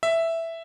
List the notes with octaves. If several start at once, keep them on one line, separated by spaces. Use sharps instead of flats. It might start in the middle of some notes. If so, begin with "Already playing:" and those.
E5